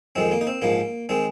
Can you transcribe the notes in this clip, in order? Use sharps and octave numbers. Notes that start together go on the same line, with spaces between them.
F2 D#3 G#3 C4
A#3
D#4
C4
A#1 G#2 F3 A#3
D#3 G#3 C4